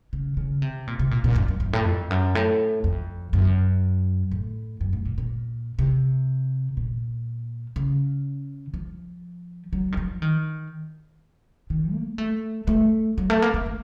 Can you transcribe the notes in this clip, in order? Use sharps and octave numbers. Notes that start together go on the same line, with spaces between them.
C#3
C#3
C3
A#2
C3
A#2
A#2
F#2
F#2
F#2
A2
F2
F#2
A2
F2
F#2
A2
F#2
A2
A#2
A#2
C3
A#2
C#3
F3
F#3
D#3
F3
D#3
D#3
A#3
A3
A3
F#3
A3
A#3
A#3
A#3